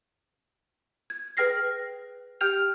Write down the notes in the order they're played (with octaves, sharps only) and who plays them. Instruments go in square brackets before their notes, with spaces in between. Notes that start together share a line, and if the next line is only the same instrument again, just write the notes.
[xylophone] G#6
G#4 B4 G5 F6 A#6 C7
G4 G5 F6 G6 F7